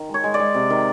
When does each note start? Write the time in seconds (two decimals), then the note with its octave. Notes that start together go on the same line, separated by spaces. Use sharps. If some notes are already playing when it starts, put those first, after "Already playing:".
Already playing: D#3
0.09 G#3
0.14 C#5
0.24 G#3
0.34 D5
0.40 G#3
0.54 C3
0.70 D#3